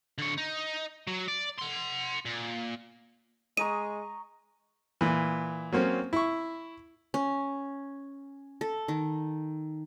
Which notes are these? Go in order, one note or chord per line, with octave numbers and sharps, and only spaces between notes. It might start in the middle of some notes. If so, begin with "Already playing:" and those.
D3 C#5
D#4
F#3
D5
F#5 C6
A#2
G#3 D#5 A#5 C#6 D#7
A#2 E3
F#3 A#3 C4 C#4
E4 C#6
C#4
A4
D#3